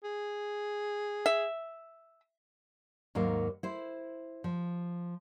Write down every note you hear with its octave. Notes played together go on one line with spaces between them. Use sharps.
G#4
E5
D#2 G#2 F#3 A#3
E4 C5
F3